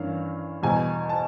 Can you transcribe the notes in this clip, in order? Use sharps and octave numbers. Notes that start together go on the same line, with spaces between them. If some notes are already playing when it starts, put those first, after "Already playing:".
Already playing: G2 E3 A#3 C#4 F5
E2 B2 G3 G#5
A5